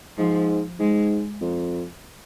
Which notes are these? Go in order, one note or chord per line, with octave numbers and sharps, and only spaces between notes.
G#2 F3
G#2 G#3
F2